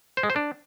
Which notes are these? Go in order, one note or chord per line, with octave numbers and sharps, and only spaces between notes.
C5
G#3
C5
D4